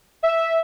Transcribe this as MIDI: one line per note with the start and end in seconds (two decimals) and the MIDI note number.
0.23 0.58 76